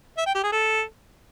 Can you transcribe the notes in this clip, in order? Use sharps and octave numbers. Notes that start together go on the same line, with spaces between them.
E5
G5
G4
G#4
A4